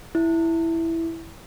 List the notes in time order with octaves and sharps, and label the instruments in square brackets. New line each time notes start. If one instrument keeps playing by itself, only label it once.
[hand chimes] E4